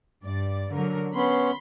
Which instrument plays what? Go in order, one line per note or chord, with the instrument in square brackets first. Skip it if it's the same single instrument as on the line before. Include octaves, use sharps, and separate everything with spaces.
[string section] G2 D5
D3 F#3 A#4
[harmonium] B3 C#4 [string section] B5 C6